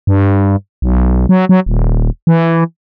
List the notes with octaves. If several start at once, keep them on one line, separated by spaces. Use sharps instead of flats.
G2
B1
F#3
F#3
D#1
E3